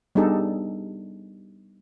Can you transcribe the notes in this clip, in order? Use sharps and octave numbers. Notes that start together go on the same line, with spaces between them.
G3 B3 D4 D#4 G#4 A4